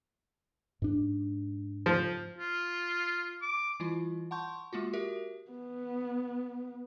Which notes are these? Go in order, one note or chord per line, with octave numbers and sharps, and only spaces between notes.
G#2 D4
F3
F4
D6
E3 G3 E4 F4
F#5 A5 C6 C#6 G6
G#3 A#3 F4 F#4
F#4 G4 A#4 E5
B3